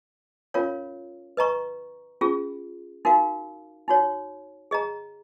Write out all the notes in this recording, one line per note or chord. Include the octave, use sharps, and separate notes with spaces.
C#4 F4 A#4 C#5 F5
B4 D#5 A#5 C#6
C#4 F4 G#4
D#4 F#4 A#4 F5
D#4 F#4 C#5
G#4 D#5 A#5